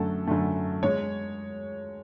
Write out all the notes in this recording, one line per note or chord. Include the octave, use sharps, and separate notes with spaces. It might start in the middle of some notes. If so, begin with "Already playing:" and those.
Already playing: F#2 D3 A3 A4
F#2 D3 A3
G#3 C#5